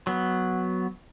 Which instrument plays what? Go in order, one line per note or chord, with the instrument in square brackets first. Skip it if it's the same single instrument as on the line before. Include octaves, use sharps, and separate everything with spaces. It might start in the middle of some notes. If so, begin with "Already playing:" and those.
[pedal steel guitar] F#3 B3